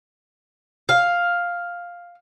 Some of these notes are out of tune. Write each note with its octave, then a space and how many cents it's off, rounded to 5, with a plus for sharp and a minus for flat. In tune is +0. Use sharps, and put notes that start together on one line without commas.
F5 +5